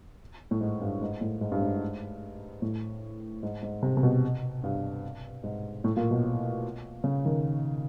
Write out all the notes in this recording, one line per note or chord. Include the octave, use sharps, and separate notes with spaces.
A2
G#2
G2
G#2
A2
G#2
G2
G#2
A2
G#2
G#2
C3
C3
B2
G2
G#2
A2
A#2
B2
C#3
D#3